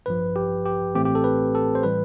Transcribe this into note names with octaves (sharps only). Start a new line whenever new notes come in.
A1 G2 F3 B4
G4
G4
A1 A2 E3 A3 C4 G4
G4
A4
B4
A4
C5
A2 E3 G3 B4